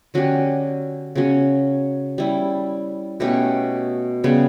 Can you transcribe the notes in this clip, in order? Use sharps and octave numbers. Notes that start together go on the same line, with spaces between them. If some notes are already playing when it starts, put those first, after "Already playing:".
D3 F#3 C#4 G4
C#3 F#3 C#4
G3 C#4 E4
B2 A3 C#4 G4
C#3 G3 B3